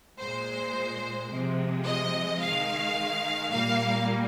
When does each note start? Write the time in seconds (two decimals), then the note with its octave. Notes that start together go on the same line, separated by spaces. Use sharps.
0.19 A#2 G#3 C5
1.30 C3 F3 G#3
1.86 D#5
2.41 D#3 G#3 F5
3.51 A#2 G3 A#3 F5